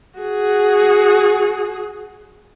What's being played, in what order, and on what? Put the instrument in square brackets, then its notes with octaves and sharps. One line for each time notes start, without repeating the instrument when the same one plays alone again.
[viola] F#4 G#4